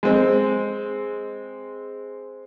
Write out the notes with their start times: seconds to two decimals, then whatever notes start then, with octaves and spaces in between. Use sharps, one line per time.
0.03 G#3 C4